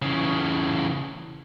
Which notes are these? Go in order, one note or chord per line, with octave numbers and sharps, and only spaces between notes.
C#3 E3